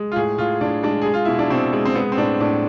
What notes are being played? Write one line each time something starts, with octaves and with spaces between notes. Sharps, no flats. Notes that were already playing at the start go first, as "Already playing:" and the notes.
Already playing: G#3
F4
A2 G#4
A2 F4
A2 D4
G#3 D4
G#3 G#4
F4
B2 E4
D4
B2 C4
G#3
C4
G#3 B3
C4
A2 D4
A2 D4